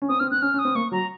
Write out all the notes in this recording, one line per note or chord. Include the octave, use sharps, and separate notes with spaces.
C#4
C4 D#6
C4 F6
C4 F#6
C#4 F6
C#4
D#6
C4
A#3 C#6
F#3 A#5